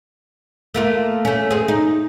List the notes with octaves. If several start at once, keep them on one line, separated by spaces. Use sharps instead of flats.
A3 A#3 F4
A3 C#4
C4 G#4
D#4